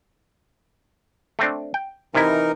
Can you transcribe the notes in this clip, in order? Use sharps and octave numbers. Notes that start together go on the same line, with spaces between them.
A3 C4 D4
G5
C3 E3 D#4 E4 A#4